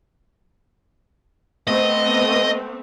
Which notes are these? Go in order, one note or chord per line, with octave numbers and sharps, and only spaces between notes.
A3 B3 C4 D#5